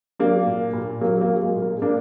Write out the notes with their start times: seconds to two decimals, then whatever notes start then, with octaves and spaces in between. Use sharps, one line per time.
0.19 F#3 A#3 D4
0.47 A#2
0.73 A#2
1.01 F#3 A#3
1.21 A#3
1.28 F#3
1.41 G#3
1.55 A#2
1.62 A#3
1.82 A#2 A#3 D4